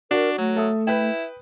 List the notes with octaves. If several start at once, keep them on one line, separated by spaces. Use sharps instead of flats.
D4 F#4 A#4
F#3 A3
A4 E5 D#6
E4 B4 G5